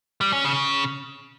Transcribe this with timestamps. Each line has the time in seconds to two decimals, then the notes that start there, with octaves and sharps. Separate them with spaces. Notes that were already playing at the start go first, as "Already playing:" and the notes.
0.21 G3
0.33 C#4
0.44 C#3